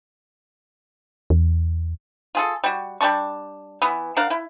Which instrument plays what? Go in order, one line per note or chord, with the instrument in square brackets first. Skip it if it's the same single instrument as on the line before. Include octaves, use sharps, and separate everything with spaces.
[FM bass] E2
[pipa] F4 G#4 A4
G3 F#4
G3 D4 A5 C#6
E3 B3
D4 A#4 F5 F#5
E4